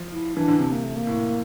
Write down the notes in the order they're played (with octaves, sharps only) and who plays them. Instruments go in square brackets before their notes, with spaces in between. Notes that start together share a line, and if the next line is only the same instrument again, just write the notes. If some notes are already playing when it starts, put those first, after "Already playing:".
Already playing: [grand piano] F3
[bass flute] E4
[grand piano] E3 [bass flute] D4
[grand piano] D3
[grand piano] C3 [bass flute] D4
[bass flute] A#3
A3
A#3
[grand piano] A2